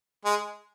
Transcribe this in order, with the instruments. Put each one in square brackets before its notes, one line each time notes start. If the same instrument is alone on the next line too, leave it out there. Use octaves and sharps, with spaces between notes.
[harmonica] G#3